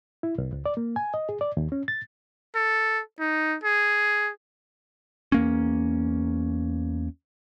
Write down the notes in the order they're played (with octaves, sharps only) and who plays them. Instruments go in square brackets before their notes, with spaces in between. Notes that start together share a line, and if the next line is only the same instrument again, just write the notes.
[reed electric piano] E4
C2
C#2
D5
A#3
G#5
D#5
G#4
D5
D#2
C#4
A6
[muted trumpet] A4
D#4
G#4
[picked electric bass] E2 A#3 C#4